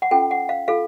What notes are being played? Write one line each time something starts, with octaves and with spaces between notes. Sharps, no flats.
F#5
C#4 F4 A4 G5
F#5
F5
F4 A4 F5